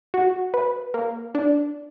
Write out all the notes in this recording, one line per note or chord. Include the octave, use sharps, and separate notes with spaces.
F#4
B4
A#3
D4